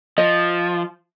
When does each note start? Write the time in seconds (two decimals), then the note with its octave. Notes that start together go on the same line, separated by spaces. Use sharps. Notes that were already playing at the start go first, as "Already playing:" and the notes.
0.18 F3 D#5